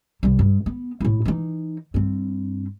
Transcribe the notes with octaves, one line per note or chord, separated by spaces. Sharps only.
C2 G3
G2
B3
A2 E4
E3 D#4
G2 C4